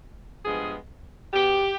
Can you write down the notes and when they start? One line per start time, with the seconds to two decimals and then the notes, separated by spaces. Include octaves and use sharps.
0.45 G2 F3 G#3 B3 G#4
1.33 B2 B3 G4